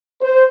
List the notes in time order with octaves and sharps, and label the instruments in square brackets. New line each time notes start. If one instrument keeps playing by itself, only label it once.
[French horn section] C5